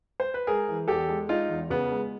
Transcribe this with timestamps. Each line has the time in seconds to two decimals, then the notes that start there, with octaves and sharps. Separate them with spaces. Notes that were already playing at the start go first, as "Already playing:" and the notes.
0.20 C5
0.34 B4
0.47 G#3 G#4 A#4
0.68 E3
0.88 E2 G4 A4
1.09 G#3
1.29 G#3 D#4 F4
1.49 E2
1.70 C#3 B3
1.91 G#3